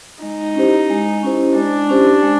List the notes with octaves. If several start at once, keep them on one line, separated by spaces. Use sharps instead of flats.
G#3 D#4
C#4 E4 G4 C5
G#3
C#4 E4 G4 C5
G#3 D4
C#4 E4 G4 C5
G#3